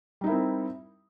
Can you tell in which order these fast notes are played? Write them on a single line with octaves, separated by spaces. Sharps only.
G3 D#4 E4 A#4 C4